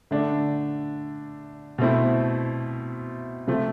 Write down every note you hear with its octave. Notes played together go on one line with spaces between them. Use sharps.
D3 A3 D4
B2 A3 C4 E4
C3 F3 A3 C4